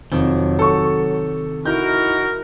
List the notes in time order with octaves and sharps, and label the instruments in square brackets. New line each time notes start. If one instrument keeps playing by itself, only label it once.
[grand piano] F2 [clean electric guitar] C3 D#3 [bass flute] F#3
[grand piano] A4 C#6
[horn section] D#4 F#4 A#4 [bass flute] E4 [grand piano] G6